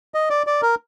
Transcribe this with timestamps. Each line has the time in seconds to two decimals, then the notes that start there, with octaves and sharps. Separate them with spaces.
0.14 D#5
0.30 D5
0.47 D5
0.62 A#4